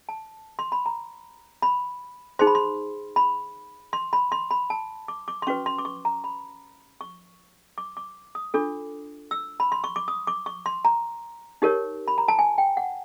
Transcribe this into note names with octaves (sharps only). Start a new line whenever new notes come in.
A5
C6
B5
A#5
B5
D#4 G#4 C5 C6
B5
C6
B5
C6
B5
C6
B5
A5
D6
D6
C6
C#4 F#4 B4 C#6
C6
D6
C#6
A#5
B5
C#6
D6
D6
D#6
D4 F4 A4 D6
E6
B5
C6
C#6
D6
D#6
D6
C#6
C6
A#5
D#4 G4 A#4 C#5
B5
A#5
A5
G#5
G5
F#5